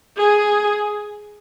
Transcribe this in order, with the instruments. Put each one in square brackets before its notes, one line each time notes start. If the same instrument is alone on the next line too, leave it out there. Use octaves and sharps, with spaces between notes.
[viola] G#4